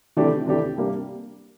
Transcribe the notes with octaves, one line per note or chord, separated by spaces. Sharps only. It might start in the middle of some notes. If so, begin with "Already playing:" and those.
C3 E3 A3 D4 G4
C3 E3 A3 D4 G4
C3 G3 A#3 D4 G4